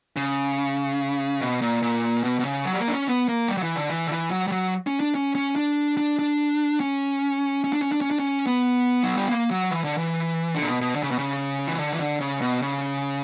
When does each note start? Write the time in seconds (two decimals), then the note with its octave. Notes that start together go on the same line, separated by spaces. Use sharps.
0.16 C#3
1.41 B2
1.62 A#2
1.82 A#2
2.24 B2
2.39 B2
2.45 C#3
2.65 F#3
2.73 G3
2.80 A#3
2.88 D4
2.93 C#4
3.08 B3
3.28 A#3
3.48 G3
3.57 F#3
3.63 E3
3.76 D3
3.90 E3
4.07 D3
4.11 E3
4.31 F#3
4.47 G3
4.52 F#3
4.87 C#4
5.00 D4
5.15 C#4
5.35 C#4
5.56 D4
5.97 D4
6.19 D4
6.80 C#4
7.64 C#4
7.73 D4
7.82 C#4
7.92 D4
8.01 C#4
8.11 D4
8.19 C#4
8.47 B3
9.03 F#3
9.17 G3
9.29 A#3
9.51 F#3
9.71 E3
9.84 D3
9.98 E3
10.55 D3
10.62 A#2
10.68 B2
10.81 B2
10.95 D3
11.03 C#3
11.11 B2
11.19 C#3
11.67 E3
11.79 D3
11.93 E3
11.99 D3
12.20 C#3
12.42 B2
12.62 C#3